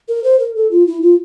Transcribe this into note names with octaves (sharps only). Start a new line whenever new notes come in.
A#4
C5
A#4
A4
F4
E4
F4